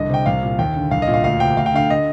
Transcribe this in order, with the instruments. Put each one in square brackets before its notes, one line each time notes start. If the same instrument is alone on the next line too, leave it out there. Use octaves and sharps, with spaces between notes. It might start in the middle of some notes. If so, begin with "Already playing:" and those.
Already playing: [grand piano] C2 D3 D#5
C3 G5
C2 F5
A#2
D#2 G5
D3
C2 F5
D#5
A#2
F5
D2 F5
C3 G5
D2 F5
G5
D3 F5
D#5